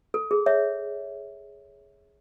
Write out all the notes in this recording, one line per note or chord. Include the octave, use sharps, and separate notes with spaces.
A4
G#4
C#5 E5